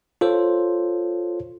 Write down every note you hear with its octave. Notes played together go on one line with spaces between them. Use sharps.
F4 A4 C5 C#5